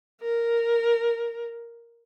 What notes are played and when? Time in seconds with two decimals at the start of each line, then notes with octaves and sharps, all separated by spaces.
0.21 A#4